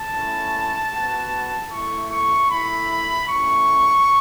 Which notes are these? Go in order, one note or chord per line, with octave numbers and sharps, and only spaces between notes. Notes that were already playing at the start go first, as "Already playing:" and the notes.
Already playing: A5
A3 C#4 E4
B3 F#4
A3 E4 C#6
C#6
A3 E4 B5
A3 C#4 E4 C#6